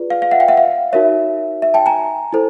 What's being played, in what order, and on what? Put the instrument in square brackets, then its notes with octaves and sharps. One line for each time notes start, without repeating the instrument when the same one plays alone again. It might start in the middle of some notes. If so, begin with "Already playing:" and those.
Already playing: [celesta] F4 G#4 B4 D5
F5
F5
E5 F#5
F5 G5
E5 F#5
F5
D#4 F#4 A#4 C#5 E5
E5
G5 A5
G#5 A#5
E4 A4 C5